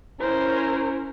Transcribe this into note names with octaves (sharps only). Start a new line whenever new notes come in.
C#4 E4 A#4 C5